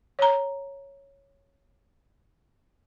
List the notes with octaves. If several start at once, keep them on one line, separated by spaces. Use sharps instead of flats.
C#5 A#5